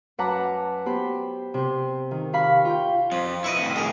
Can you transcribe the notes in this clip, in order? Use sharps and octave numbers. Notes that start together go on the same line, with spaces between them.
F#2 B4 F#5 A5 A#5 D6
B3 G4 C5 B5
C3 C5
D#3
G4 F5 B5 C#6
F4 G5
F2 F3
E4 B4 D#5 C#6
F2 A2
G#4 A#4